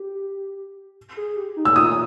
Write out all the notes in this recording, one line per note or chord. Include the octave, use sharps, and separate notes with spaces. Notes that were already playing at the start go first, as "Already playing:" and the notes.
Already playing: G4
G#4
G4
D#4
E6
F4 D#6